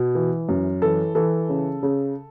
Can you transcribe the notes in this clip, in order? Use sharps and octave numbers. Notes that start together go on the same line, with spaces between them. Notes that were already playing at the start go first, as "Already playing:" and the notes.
Already playing: B2
E3
F#2
E3 A4
E3 A4
C#3
C#3